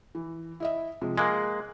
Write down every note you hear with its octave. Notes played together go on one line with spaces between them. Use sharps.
E3
E4 D#5 E5
C3 F3 G#3
G#3 A#3 C6 F#6